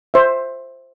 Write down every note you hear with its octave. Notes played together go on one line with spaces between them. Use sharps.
C5 E5